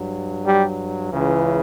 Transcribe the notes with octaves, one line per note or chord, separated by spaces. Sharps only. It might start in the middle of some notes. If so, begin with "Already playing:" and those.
Already playing: G2 F#3
G3
C#2 C#3 E3